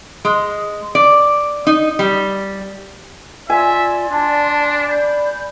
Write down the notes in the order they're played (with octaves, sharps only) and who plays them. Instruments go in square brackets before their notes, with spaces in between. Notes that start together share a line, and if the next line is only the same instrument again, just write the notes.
[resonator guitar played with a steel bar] G#3
D5
D#4
G3
[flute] F4 [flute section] D5 C6 [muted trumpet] E5 [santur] G#5
[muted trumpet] D4 [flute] A5
[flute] D5 [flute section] B5 G6